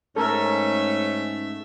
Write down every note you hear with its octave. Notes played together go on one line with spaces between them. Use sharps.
G#2 A3 C#4 A4 A#4 E5